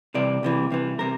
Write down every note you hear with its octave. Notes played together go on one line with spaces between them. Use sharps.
C2 C3 E3 D5
C2 C3 E3
C2 C3 E3
C3 A#4